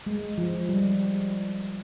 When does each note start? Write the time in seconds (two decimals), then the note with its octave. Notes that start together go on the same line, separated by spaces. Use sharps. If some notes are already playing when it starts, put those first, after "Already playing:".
0.06 G#3
0.38 F3
0.69 G3